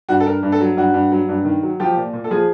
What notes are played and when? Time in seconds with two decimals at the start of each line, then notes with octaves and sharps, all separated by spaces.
0.09 G2 F#4
0.20 A4
0.26 G2 A#4
0.43 G2
0.52 A4
0.60 F#3
0.77 G2 F#4
0.94 G2
1.12 F#3
1.29 G2
1.45 D#3
1.63 F#3
1.80 F3 G4
1.97 A#2
2.13 A#2
2.24 A4
2.31 F3 G#4